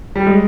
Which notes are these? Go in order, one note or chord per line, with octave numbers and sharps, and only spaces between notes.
G3
G#3